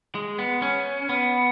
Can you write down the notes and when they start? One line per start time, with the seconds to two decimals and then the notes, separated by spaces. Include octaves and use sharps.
0.15 G#3
0.39 B3
0.62 C#4
1.09 B3